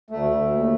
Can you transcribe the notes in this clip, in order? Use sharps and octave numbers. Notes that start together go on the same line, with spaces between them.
D2 A3
D2
D#2